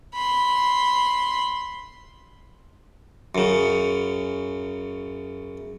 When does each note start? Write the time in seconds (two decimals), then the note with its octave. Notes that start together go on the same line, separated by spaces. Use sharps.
0.15 B5 C6
3.35 F#2 C#3